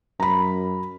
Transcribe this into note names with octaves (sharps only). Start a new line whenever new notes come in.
F#2 A#5 B5